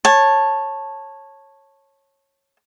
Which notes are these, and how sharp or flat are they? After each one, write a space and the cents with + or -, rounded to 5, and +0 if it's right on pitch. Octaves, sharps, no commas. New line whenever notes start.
C#5 -15 A5 +0